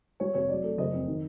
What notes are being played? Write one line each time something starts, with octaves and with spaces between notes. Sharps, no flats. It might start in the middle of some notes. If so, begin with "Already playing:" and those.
G3 C#5
F1 C#5
F#3 D5
A3
F#1 D#5
F2
D#3